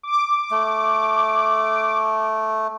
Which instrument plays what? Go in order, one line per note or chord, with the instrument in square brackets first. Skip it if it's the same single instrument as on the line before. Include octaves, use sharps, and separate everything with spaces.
[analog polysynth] D6
[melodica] A3